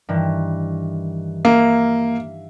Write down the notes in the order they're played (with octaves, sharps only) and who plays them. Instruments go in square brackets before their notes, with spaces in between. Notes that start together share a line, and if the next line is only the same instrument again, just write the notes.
[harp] G2 D#3 E3
[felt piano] A#3 [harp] E5 F5